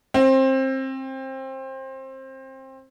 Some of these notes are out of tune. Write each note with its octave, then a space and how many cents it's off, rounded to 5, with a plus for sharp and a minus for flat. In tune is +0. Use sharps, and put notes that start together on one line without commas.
C4 +25